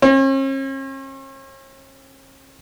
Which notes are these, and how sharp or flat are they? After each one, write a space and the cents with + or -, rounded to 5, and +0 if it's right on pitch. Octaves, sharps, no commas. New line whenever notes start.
C#4 -45